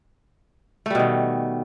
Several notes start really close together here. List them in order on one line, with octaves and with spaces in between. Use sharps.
A3 G3 B2 D#3